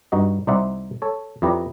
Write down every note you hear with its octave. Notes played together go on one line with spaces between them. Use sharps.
G2 D#4 F#4 D#5
C2 D#4 C5 D5 E5 F#5
A4 C#5
F2 E4 G4 B4 D5 A#5